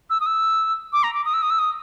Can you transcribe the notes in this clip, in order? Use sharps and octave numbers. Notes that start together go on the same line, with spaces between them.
E6
D#6
E6
D6
A#5
D6
D#6
E6
D#6
E6
D#6